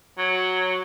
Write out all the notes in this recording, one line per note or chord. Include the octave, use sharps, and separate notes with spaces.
F#3